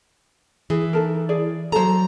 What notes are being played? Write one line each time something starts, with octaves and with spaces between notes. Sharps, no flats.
E3 G#4
D#4 A4 A#4
G#4 D5
F#3 A4 C5 A#5